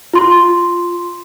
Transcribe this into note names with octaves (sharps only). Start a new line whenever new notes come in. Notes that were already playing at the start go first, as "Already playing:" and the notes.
F4 C6